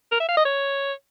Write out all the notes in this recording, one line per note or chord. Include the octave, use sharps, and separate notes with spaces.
A#4
E5
F5
D#5
C#5